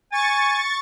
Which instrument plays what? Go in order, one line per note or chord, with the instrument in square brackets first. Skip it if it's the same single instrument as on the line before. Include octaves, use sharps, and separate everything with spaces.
[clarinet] G#5 [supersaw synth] C#6 A6